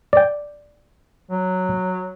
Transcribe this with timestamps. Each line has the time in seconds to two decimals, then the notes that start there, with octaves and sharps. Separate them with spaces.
0.13 D5 G5
1.31 F#3